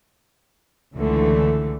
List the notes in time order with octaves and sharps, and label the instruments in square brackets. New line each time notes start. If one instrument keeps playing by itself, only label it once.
[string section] C#2 D3 E3 A3